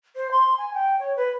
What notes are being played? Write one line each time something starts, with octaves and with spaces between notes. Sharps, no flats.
C5
C6
G#5
G5
C#5
B4